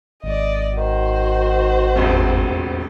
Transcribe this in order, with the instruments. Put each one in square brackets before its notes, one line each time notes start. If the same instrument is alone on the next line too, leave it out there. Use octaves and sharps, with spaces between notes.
[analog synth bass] G#1 [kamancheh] D5 D#5
[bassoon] D#3 [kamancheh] F#4 C5
[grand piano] E1 A1 F2